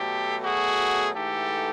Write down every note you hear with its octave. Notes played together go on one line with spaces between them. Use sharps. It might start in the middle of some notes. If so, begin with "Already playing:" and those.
Already playing: B2 F#3 A3 G4 A4
F#4 G#4
G#2 E3 A3 G4 A4